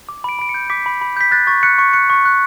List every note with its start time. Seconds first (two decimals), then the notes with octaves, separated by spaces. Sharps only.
0.09 D6
0.24 B5 D7
0.39 B5 D7
0.49 C#7
0.54 G6
0.70 D6 B6
0.86 B5
1.01 B5
1.17 G6 B6
1.31 F#6 A6
1.47 C#6 A6
1.63 F#6 C#7
1.78 C#6 C#7
1.93 F#6 C#7
2.10 C#6 C#7
2.25 F#6